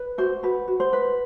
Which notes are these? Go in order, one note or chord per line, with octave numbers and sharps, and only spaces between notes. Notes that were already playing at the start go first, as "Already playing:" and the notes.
Already playing: B4
F#4 C5
F#4 B4
F#4
C5
B4